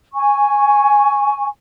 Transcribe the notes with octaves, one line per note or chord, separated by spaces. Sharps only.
G#5 C#6